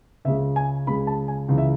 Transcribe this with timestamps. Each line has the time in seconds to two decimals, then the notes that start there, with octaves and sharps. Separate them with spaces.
0.25 C#2 C#3 G#3 E5
0.56 G#5
0.87 C#2 C#3 G#3 B5
1.07 A5
1.28 G#5
1.49 C#2 C#3 E3
1.58 E5